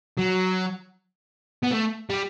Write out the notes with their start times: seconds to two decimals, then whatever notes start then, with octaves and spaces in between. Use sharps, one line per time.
0.18 F#3
1.63 B3
1.71 A3
2.10 G3